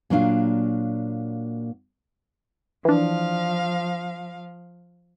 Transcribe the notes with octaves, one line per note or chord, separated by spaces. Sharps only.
A#2 F#3 A#3 D4 F5
E3 F3 D4 F5